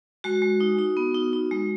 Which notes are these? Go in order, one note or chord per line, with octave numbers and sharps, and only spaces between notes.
G#3 F#4
G#3
D#4
D#4
B3
D#4
D#4
G#3